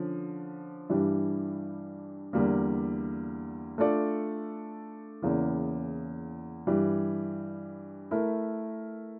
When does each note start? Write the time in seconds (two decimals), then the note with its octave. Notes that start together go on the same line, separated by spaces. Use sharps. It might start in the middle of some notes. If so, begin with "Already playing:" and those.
Already playing: D3 F3 C#4
0.90 G2 E3 G3 D4
2.33 E2 D3 G3 A#3
3.78 A3 D4 F4 A4 D5
5.22 E2 C#3 E3 A#3
6.67 G2 E3 G3
8.11 A3 E4 A#4